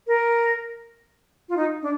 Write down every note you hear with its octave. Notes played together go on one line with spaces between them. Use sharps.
A#4
F4
D#4
D4